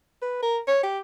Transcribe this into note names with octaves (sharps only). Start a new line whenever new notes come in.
B4
A#4
C#5
G4